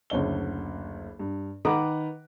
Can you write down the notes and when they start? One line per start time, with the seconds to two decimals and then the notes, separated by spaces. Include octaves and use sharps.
0.10 F#1 D2 C#5 G7
1.19 G2
1.65 D#3 B4 F#5 A#5 D6